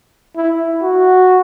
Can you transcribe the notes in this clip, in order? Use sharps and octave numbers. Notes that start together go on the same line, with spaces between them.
E4
F#4